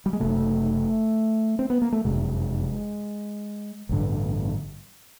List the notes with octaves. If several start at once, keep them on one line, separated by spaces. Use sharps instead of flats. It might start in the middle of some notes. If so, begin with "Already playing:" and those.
G3
G#3
F#1 E2 C3 A3
C4
B3
A#3
A3
F#1 F2 C3 G#3
A1 G2 D3